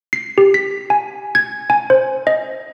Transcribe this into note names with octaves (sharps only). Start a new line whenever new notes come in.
C7
G4
B6
G#5
G#6
G#5
C5
D#5